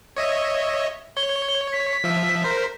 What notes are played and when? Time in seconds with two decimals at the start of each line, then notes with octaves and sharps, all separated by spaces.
0.17 C#5 D#5 E5
1.17 C#5 G7
1.73 B6
2.04 F3 E5
2.44 A#4 C5